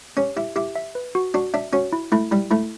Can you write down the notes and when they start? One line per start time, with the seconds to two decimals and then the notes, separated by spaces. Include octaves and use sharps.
0.17 C#4 G4
0.36 E4 G4
0.56 E4 G4
0.75 E5
0.95 B4
1.15 F#4
1.34 D4 F#4
1.54 D4 E5
1.73 C#4 F#4
1.93 E4
2.12 A3 E4
2.31 G3 E4
2.51 A3 E4